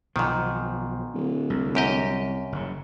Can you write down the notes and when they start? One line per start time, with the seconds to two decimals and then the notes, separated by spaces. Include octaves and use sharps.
0.16 B1 G#2 D#3 F3
1.13 D1
1.50 C2
1.75 F#2 G4 D#5
2.52 F#1 C#3